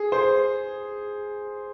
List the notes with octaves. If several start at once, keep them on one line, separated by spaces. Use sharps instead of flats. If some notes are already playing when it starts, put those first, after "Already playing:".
Already playing: G#4
C5